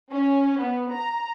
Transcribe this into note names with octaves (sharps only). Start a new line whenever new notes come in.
C#4
B3
A#5